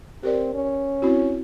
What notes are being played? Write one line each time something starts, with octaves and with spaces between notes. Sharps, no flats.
C4 G4 A#4 D5
C#4
C4 E4 F#4